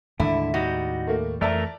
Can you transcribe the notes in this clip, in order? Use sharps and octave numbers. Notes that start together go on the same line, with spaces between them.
D#2 A2 D3 G#3 E4
G3 D#4 F#4
A3 A#3
F2 E3 F3 A3 A#4 D5 E5 A5